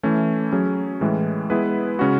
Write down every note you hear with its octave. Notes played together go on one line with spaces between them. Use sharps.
E3 A3 C#4
F#3 C#4 G#4
A2 E3 G#3
G#3 B3 E4 G#4 B4
C#3 G#3 C#4 F#4